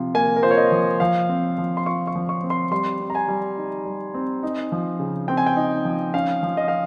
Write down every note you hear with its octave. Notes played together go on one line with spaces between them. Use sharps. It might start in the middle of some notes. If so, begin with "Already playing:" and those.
Already playing: C3 F3 F4
A#3 G#5
A#4
F4 C5
C#5
D#5
F3
F3 F5
C4
F3
C6
F4 C#6
C#6
F3
C#6
C4
C6
G3 C6
C4
A#5
G#5
G3
D#4
G3
C4
D#4
F3
C#3
C4 G5
G#5
G5
D#4
F3
C#4 F5
F3
D#5
F5